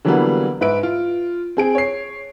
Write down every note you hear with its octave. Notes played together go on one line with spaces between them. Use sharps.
D3 E3 F#3 G3 A#3 B3
G#2 B4 E5 D7
F4
C4 G#4 D7
C#5 C7